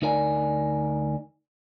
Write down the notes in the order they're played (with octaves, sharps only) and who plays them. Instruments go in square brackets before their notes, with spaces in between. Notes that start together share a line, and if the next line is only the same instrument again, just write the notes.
[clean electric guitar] D2 D#4 A#4 D5 G#5